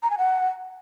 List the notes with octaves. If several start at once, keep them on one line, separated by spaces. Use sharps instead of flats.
A#5
G#5
F#5